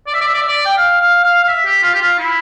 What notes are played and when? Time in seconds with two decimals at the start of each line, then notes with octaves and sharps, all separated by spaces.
0.07 D5
0.14 E5
0.21 D5
0.27 E5
0.34 D5
0.42 E5
0.48 D5
0.65 G5
0.77 F5
1.01 F5
1.24 F5
1.43 F5
1.48 E5
1.65 G4
1.83 F4
1.94 G4
2.01 F4
2.19 E4